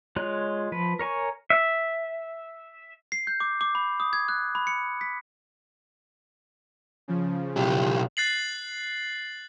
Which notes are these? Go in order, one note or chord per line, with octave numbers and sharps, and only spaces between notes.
G#3 F4 C#5 F#6
F3 B4
A#4 C#5 G#5 C#6
E5
C7
G6
D6
D6
B5
D#6
G#6
F#6
B5
C#7
B6
C#3 F3
B1 G4
F#6 A6 C7 F#7